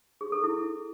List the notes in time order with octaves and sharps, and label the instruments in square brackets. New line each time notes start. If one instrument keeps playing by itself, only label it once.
[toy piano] G#4
A4
E4